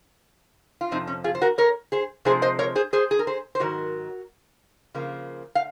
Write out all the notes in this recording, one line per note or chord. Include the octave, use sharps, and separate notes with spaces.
F4
F2 C3 F3 C4 D#4
C#4
F4 G#4
C5
F#4 A#4
A#4 C#5
G#4 C5
C3 F3 G#3 C4 G#4 C5
C5 D#5
A#4 C#5
G#4 C5
G#4 C5
G#4
A#4
G#4 C5
C5
G#2 D#3 F#3 F#4 A#4
C#3 F3 A#3
F5